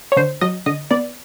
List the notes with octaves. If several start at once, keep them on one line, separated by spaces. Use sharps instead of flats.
C#5
D3 C5
F#3 D#5
D3 D#5
B3 D5